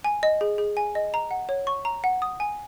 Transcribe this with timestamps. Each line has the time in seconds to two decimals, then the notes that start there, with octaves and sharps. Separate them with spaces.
0.04 G#5
0.23 D#5
0.41 G#4
0.58 G#4
0.77 G#5
0.95 D#5
1.14 A#5
1.31 F#5
1.49 C#5
1.67 C#6
1.85 A#5
2.04 F#5
2.22 D#6
2.40 G#5